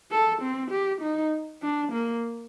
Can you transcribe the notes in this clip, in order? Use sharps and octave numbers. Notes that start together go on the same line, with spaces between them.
A4
C4
G4
D#4
D4
A#3